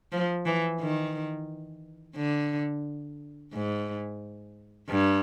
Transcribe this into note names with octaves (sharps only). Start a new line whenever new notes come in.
F3
E3
D#3
D3
G#2
G2